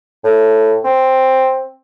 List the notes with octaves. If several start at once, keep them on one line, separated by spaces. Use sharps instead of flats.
A2
C4